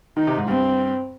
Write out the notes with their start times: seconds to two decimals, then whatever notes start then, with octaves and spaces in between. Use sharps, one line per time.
0.17 D#3 D#4
0.27 C3
0.37 G#2
0.48 G2 C4